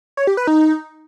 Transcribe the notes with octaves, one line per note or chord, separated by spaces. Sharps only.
C#5
G4
B4
D#4